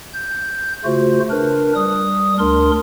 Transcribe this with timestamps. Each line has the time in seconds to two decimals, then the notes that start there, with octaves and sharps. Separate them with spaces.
0.13 G6
0.85 C#3 A3 F4 F#4 C5
1.30 D4 A#4 B4
1.75 G3 D#6
2.38 D2 D4 A#4 C6